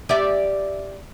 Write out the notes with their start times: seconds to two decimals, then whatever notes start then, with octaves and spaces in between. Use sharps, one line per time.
0.09 G4 D5 E5